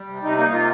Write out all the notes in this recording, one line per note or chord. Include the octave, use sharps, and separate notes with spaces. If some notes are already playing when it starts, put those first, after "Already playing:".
Already playing: G3
C3
C3 D#4
A#3 D#4
C3 F4